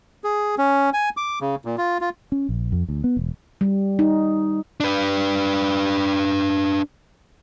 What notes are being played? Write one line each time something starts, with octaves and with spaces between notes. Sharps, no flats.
G#4
C#4
G#5
D6
C#3
A#2
F4
F4
C#4
A#1
F2
D2
B3
E1
G3
D#4
D4 B4